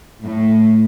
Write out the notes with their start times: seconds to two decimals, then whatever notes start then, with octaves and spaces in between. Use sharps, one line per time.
0.24 A2